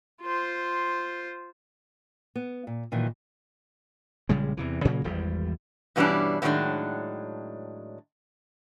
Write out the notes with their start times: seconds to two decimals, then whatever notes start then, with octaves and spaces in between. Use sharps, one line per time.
0.22 F4 C5
2.35 B3
2.67 A#2
2.92 A#2 D#3 E3 F#3
4.29 A#1 C#3 G3 G#3
4.57 E2 C3 E3
4.85 A#2 C#3 F#3 A#3
5.04 G#1 E2 G3
5.96 G2 B2 E3 G3 C#4 D4
6.42 A2 D3 D#3 F#3 G#3 D4